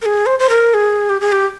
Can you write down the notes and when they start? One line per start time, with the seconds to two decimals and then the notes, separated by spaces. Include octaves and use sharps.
0.02 A#4
0.06 G#4
0.26 C5
0.39 C5
0.50 A#4
0.74 G#4
1.10 G4
1.21 G#4
1.32 G4